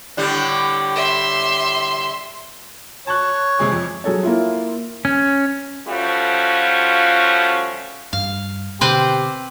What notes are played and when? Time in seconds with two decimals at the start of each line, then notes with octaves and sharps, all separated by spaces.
0.17 A2 D3 G3
0.95 E5 C6
3.07 C#5 A5 C#6 F#6
3.59 C3 G#3 G#4
3.71 F2
4.04 F#3 G#4 A4 C#5
4.23 A#3 E4 F4
5.05 C#4
5.88 F3 G3 A3 C#4 F4 F#4
8.13 G2 F5
8.81 B2 D3 C4 G4 B4 C5